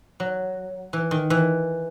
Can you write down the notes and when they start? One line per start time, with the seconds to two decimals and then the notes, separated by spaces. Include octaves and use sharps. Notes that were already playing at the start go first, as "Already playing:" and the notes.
0.20 F#3
0.93 E3
1.11 D#3
1.30 E3